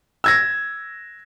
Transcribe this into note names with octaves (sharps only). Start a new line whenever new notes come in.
E6 G#6 A#6